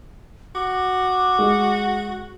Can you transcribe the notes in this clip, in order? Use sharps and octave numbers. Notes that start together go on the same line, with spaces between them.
F#4 D6
G#3